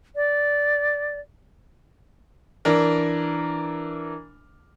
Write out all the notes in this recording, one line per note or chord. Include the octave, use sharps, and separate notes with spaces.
D5
E3 D4 A#4